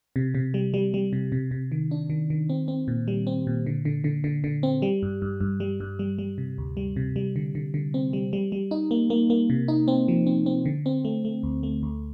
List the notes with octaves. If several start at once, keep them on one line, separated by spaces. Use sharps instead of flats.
C3
C3
G3
G3
G3
C3
C3
C3
D#3
D4
D#3
D#3
C4
C4
A#2
G3
C4
A#2
D3
D3
D3
D3
D3
C4
G3
G2
G2
G2
G3
G2
G3
G3
C3
D2
G3
C3
G3
D3
D3
D3
C4
G3
G3
G3
D#4
A#3
A#3
A#3
C3
D#4
C4
F3
C4
C4
D3
C4
A3
A3
D2
A3
D2